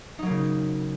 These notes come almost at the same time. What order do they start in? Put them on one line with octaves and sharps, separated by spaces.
D#4 F#3 A#3 C#3